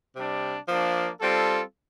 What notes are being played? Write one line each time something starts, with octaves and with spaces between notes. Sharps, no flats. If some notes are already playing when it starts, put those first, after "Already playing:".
C3 G3 D4
F3 A#3 D4
G3 C4 F4 A4